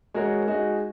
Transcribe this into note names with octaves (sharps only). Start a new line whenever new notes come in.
G#3 F#4 A#4 C#5
G#3 D#4 F#4